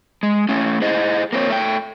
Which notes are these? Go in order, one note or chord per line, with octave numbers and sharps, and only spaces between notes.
G#3
A3 C#4
E4 G#4 C5 D#5
A#3 C4 D4 C#5
A3 G5